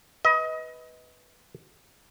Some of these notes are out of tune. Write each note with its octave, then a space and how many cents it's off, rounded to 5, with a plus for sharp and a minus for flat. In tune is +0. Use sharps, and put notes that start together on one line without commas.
B4 +0 D#5 +25